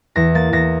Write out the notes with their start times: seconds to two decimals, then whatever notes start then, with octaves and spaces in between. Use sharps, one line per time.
0.16 E2 A#6
0.35 A#3 A6
0.53 E2 A#6